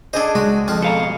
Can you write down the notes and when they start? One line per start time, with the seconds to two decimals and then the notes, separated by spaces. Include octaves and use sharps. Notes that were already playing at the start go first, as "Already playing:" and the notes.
0.13 D4 G#4 A4 C5 D#5
0.35 C#2 G#3 F#4
0.68 F2 F3 F4
0.82 B2 A4 F5 A#5